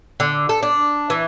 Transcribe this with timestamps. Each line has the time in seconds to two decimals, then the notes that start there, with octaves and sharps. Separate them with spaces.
0.20 D3
0.49 A4
0.63 D4
1.10 E3